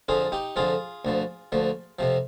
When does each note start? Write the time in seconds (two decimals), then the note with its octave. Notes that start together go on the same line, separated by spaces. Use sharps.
0.08 F2 D3 F3 F4 G#4
0.32 D#4 G4
0.56 F2 D3 F3 F4 G#4
1.05 D2 D3 F3
1.52 D2 D3 F3
1.99 F2 C3 F3